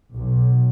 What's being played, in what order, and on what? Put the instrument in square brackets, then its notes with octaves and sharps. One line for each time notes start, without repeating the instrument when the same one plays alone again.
[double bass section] B1